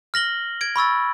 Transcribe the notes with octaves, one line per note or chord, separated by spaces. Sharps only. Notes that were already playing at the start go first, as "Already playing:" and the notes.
F6 A#6 F#7 G7
G#6 D7
B5 C#6 E6 A6